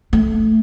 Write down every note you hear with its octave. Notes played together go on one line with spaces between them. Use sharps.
A3